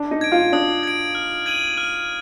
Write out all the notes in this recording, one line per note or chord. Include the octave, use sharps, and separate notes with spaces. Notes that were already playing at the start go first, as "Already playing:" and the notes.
Already playing: D4
D#4
G#6 D7
F4
D4 D#6
G#6 D7
F6
G#6 D#7 F#7
F6